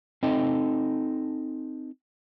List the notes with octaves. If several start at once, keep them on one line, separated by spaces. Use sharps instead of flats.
C4 D#4 A4 D#5